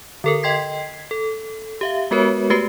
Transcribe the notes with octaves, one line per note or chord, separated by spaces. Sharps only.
D3 A4 A#4
D#5 G5 C6 G#6 B6 C7
A4
G4 E5 F5
G#3 B3 F#4 A#4 B4 C#5
A3 F#4 G4 B4 C7